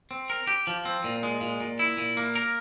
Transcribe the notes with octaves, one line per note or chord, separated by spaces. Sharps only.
C4
A#4
G4
F3
C4
A#2
G#3
A#2
A#2
E4
A#2
A#3
A#4